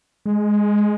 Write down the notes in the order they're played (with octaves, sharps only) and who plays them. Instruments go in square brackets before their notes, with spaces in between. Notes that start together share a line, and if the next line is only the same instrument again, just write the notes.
[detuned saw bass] G#3